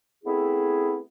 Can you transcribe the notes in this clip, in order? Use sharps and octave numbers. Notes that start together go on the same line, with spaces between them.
A3 B3 C4 E4 G#4